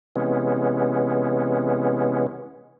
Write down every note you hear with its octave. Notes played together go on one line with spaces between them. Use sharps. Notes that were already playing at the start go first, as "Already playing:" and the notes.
C3 E3 G#3 B3 C#4